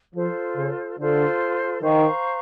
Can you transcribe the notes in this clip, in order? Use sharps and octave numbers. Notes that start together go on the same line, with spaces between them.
F3 F4 A4 C5
C#3
D3 F4 A4 C5
D#3 C5 F5 A#5 C#6